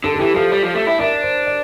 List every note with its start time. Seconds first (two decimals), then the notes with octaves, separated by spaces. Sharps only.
0.04 D3 A4
0.14 A4
0.19 E3 G4
0.36 F3 A4
0.52 G3
0.63 F3
0.75 A3
0.87 E4
0.99 D4 A#4
1.23 C5
1.47 D5